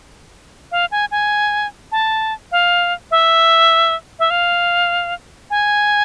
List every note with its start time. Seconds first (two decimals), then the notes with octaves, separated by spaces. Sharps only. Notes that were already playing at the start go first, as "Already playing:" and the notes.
0.72 F5
0.91 G#5
1.11 G#5
1.92 A5
2.52 F5
3.11 E5
4.19 E5
4.30 F5
5.50 G#5